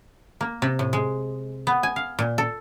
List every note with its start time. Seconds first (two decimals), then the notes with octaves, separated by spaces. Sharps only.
0.41 A#3
0.62 C3
0.79 A2
0.93 G#3
1.67 B3
1.83 G#5
1.96 F5
2.19 A#2
2.38 A4